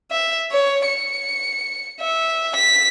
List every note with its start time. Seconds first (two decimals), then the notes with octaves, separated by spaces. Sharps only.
0.11 E5
0.52 C#5
0.86 C#7
2.00 E5
2.55 B6